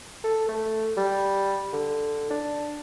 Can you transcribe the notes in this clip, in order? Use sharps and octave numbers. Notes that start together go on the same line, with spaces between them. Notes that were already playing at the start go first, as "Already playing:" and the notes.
A4
A3
G3
D3
D4